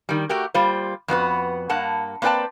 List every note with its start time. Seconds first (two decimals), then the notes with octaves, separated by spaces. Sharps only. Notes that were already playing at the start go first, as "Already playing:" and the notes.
0.09 D#3 G3
0.29 A3 F#4 G4 A#4
0.54 G3 A#3 F4 C5
1.08 F2 B3 F#4 B4
1.69 G2 A#3 F#5 A5
2.22 A#3 C4 B4 D5 G5 A5